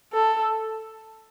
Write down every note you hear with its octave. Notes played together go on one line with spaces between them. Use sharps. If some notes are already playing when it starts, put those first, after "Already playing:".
A4